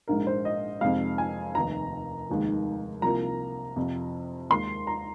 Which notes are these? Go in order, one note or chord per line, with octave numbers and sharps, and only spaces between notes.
A#1 G#2 G#3 A#4
C5
D#5
F2 C3 D#3 G#3 F5
G#5
F1 D#2 D#3 A#5
F1 D#2 D#3 G#3
C2 C3 F3 A#3 A#5
F2 C3 F3
D#2 D#3 G#3 C6
A#5